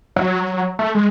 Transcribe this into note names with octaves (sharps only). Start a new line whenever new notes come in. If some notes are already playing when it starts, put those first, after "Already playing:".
F#3
A3
G#3